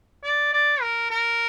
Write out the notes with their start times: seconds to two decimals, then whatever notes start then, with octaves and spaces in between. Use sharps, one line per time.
0.24 D5
0.53 D5
0.82 A#4
1.11 A#4